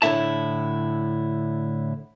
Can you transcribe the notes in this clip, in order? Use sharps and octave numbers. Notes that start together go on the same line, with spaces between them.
A2 D3 E4 E5 A5